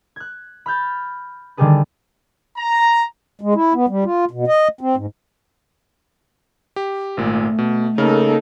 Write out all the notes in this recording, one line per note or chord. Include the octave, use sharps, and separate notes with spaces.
F#6 G#6
B5 F6 G6 A6
D3 D#3 G3 G4 G#4 B4
A#5
G#3
E4
B3
G3
F4
B2
D#5
C4
G#2
G4
G#1 A#2 A3
B2
C#3 A#3 D#4 A4 F6